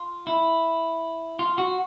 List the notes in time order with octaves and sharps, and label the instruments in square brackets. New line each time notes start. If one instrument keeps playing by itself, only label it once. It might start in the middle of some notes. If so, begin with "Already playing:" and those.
Already playing: [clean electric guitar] F4
E4
F4
F#4